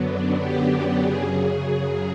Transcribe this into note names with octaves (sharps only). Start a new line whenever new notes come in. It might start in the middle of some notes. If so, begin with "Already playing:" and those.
Already playing: F#2 D3 F#3 B3
D4
G4
F#2 C#3 F#3 G#4
G#4